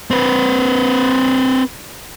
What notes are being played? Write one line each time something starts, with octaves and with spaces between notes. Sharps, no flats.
C4 B4